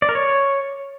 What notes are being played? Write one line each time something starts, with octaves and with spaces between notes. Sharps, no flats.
D5
A#4
C#5